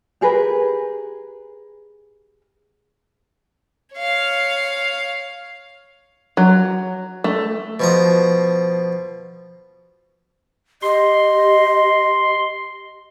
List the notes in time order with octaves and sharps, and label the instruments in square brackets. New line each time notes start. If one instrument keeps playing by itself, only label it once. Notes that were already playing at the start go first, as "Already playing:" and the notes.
[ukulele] G4 G#4 A#4 B4
[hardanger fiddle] C#5 F5
[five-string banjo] F#3
A3
[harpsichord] B2 F3 A#5
[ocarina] G4 [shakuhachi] D#5 [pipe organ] C6